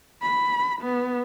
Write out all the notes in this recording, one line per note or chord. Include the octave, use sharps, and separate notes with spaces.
B5
B3